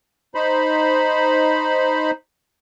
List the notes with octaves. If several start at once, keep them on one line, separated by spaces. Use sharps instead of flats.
D#4 C5 B5